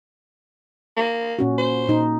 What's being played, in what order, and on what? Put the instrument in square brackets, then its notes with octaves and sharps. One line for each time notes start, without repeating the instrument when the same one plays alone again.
[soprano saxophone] A#3
[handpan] A#2 C#4 F#4
[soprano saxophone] C5
[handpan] A#2 D#4